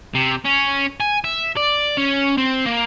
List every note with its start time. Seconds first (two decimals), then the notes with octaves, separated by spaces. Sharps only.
0.15 C3
0.45 C#4
1.00 G#5
1.24 E5
1.57 D5
1.98 C#4
2.37 C4
2.66 A#3